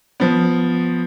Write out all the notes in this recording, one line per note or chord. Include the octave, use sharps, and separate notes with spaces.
F3 B3